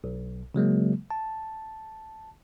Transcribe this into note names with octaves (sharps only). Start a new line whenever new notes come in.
B1
C#3 F#3 G#3 A#3
A5